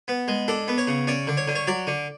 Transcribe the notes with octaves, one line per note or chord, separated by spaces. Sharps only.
B3
G#3
D4 A4
B3
C#5
C#3
C#4 D5
D3
C#5
D3
C#5
F#3 D5
D3